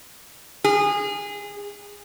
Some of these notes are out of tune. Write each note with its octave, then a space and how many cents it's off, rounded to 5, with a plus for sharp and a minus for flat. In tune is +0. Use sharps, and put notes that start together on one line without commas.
G#4 -25